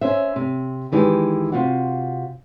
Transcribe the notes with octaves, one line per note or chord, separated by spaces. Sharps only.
C#4 C5 E5
C3
D#3 E3 G#3 D#4 G4
C3 F4 F#4